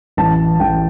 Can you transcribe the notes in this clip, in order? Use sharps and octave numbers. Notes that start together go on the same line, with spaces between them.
A1 A5
A1 G5